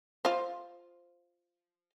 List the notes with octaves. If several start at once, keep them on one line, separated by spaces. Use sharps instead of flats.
F4 C5